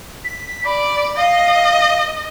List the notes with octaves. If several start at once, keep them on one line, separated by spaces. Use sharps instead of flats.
B6
D5 B5
D#5 F5